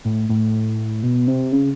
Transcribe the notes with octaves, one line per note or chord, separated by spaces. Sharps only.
A2
A2
B2
C3
C#3